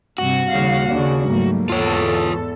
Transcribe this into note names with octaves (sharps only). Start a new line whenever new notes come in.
G2 C3 F#4
D#2 C#3 G3 F5
D#2 C#3 D4
G#2 F#3 G3 A3 A#3
E2 G#2 E3 F4 A4 C#5